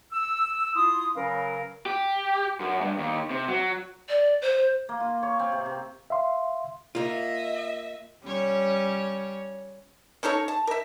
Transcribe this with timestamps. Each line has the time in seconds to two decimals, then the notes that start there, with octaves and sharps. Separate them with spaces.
0.12 E6
0.76 E4 F4 C6 D#6
1.15 C#3 F#3 C#4 A#4 B4 F5
1.86 G4
2.60 F#2
2.81 G2
2.98 D#2
3.30 C3
3.48 F#3
4.09 D5
4.42 C5
4.89 A#3
5.00 F4
5.23 C#5
5.39 C4
5.52 C3
5.66 C3
6.10 E5 F5 C6
6.95 A#3 F4 D#5 E5
8.24 G3 C#4 C#5
10.23 C#4 D#4 A4 C#5
10.48 A5
10.67 A#4 E5